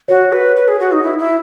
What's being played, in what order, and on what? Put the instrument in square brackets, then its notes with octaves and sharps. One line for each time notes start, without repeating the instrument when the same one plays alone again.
[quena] F#4 [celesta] C#5
[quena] B4
B4
G#4
F#4
D#4
E4
E4